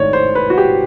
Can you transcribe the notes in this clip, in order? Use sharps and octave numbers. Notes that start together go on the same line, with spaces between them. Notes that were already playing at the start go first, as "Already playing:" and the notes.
Already playing: G#1 G#2 A3 C#5 D5
C5
B4
F#4
G4